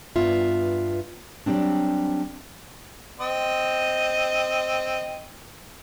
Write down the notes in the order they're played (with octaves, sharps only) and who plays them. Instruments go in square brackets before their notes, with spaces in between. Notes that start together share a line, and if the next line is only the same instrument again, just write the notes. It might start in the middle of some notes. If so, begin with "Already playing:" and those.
[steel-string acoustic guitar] G2 B3 F4 E5
F#3 G3 A3 C4 D4
[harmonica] C4 D#5